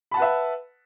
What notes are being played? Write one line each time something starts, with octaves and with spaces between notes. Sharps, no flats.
B4 E5 F#5 A5 B5